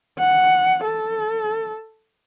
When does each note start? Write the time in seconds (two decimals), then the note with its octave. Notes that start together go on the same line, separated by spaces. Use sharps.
0.19 F#5
0.85 A4